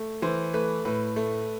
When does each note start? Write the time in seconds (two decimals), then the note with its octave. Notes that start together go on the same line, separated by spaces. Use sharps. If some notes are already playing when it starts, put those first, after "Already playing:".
Already playing: A3
0.22 E3 C5
0.53 A3 B4
0.85 A2 B4
1.16 A3